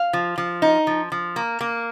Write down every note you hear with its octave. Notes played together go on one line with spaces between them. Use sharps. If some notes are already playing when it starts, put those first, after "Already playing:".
Already playing: F5
F3
F3
D#4
F3
F3
A#3
A#3